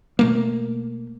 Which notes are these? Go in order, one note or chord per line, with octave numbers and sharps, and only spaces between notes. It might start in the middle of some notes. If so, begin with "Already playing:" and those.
B2 A3 A#3